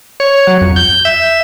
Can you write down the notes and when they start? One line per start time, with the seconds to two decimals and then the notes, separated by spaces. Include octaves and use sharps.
0.20 C#5
0.47 F#3
0.61 F2
0.76 G6
1.05 E5